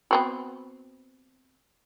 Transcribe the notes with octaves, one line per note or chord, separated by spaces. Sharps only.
B3 C4 F#4